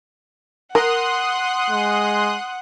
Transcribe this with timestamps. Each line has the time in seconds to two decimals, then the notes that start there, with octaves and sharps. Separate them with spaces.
0.75 A#4 F#5 C6 D#6 F#6
1.70 G#3